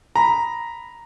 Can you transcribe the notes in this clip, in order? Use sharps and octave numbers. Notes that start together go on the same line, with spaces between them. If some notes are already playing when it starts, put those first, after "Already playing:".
A#5 B5